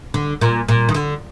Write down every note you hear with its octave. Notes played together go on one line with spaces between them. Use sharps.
D3
A#2
A#2
D#3
D3